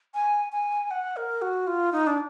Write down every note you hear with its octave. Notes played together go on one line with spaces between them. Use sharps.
G#5
G#5
F#5
A#4
F#4
F4
D#4
D4